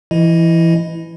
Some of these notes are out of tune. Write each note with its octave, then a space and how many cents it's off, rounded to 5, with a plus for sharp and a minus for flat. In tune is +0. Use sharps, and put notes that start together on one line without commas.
E3 +25 E4 +0 D#5 +0